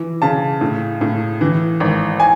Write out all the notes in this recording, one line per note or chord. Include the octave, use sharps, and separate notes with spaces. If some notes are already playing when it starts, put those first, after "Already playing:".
Already playing: E3
C#3 A5
A2
A2
E3
G#1
G#5